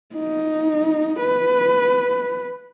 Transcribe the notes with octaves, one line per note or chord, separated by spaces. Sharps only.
D#4
B4